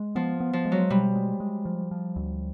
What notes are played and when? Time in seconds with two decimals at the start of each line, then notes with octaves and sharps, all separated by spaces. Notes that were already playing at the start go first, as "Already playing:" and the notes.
Already playing: G#3
0.15 F3 B3
0.40 B3
0.53 F3
0.65 G#3
0.72 F#3
0.90 B2 G3
1.15 G#3
1.40 G#3
1.65 F3
1.91 F3
2.16 D2